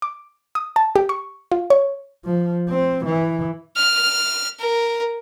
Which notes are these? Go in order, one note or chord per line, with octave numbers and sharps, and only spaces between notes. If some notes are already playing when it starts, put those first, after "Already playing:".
D6
D#6
A5
G4
C#6
F4
C#5
F3
C4
E3
F6
A#4